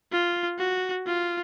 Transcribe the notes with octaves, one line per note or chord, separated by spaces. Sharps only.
F4
F#4
F4